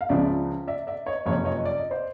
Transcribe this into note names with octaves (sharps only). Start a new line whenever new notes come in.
F5
C#2 C#3 F3 D5 E5
D5 E5
D5 E5
C#5 D#5
F#1 F2 C3 F3 C#5 D#5
C#5 D#5
D5
D#5
C5 D5